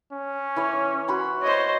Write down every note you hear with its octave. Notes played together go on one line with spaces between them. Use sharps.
C#4
E3 C#5
F#4 B5 C6
C5 C#5 D#5